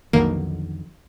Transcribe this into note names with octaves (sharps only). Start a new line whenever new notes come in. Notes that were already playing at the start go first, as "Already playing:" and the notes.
B1 F2 D3 D#3 A#3